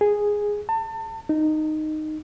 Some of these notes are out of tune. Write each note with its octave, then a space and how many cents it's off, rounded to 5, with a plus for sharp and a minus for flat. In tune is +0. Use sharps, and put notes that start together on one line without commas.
G#4 -5
A5 +35
D#4 -10